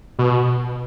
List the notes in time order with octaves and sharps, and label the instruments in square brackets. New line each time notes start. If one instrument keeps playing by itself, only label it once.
[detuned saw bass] B2